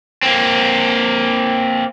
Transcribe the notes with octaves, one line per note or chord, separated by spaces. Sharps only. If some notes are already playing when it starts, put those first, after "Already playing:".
A#3 C4